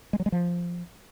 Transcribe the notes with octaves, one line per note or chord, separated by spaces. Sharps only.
G#3
F#3
G#3
F3